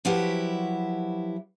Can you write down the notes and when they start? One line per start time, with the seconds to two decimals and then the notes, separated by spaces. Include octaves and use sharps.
0.05 F3 F#3 E4 F#4 G4 B4